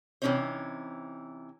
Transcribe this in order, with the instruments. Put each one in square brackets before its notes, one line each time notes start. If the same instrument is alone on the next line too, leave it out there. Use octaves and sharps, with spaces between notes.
[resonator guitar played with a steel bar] C3 E3 C4 C#4 D#4 C5